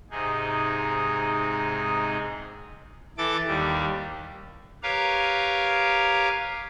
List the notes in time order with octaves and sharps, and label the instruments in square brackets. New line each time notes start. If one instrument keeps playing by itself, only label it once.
[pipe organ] G#2 C3 D#4 G#4
E3 A4 D6 A6
D#2 G3
G4 A#4 B4 C#5 F5 A#5